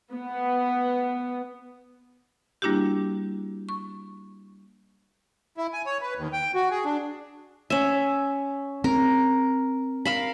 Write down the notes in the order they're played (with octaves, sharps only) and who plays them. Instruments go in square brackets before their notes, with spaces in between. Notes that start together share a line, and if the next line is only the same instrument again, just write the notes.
[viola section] B3
[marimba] G3 A#3 D4 E4 F#4 G4
C#6
[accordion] E4
G#5
C#5
B4
D#2
G5
F#4
G#4
D4
[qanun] C#4 E5
[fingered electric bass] C4 [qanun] A#4
[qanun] A#4 F5 B5